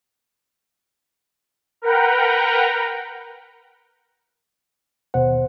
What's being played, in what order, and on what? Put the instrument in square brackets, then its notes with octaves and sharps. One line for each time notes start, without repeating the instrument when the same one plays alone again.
[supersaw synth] A#4 B4 F#5 G5 A#5
[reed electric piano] D#2 B2 F#5 [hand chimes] C5